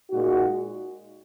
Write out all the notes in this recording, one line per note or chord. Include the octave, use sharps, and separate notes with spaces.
A#2 G#3 D#4 F#4